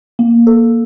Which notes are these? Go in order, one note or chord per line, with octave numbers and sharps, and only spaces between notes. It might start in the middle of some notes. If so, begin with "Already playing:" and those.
A#3
A4